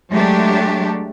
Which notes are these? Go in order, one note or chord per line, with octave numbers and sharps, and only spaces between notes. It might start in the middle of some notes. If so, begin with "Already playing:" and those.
F#3 G#3 A3 D4 G4